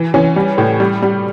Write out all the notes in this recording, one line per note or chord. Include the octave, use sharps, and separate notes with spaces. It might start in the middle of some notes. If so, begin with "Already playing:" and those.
Already playing: E3
E3 C#4
G3
A2
G3
G3